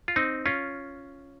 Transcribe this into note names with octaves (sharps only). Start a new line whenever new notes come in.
F4
C4 D#4
C#4 F4